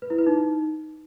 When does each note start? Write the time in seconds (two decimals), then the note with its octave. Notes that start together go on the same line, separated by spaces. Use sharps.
0.02 B4
0.10 E4
0.18 B4
0.27 D#4